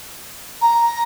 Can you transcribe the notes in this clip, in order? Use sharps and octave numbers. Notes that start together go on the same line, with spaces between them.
A#5